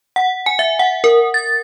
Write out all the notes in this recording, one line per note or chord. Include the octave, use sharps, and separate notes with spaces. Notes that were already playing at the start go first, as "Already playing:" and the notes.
F#5
G#5
E5
F#5
A#4
A6